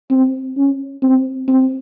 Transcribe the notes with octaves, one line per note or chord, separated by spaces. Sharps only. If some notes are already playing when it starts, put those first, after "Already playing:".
C4
C#4
C4
C4